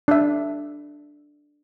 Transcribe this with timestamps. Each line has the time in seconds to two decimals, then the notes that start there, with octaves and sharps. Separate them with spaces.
0.08 D4 E5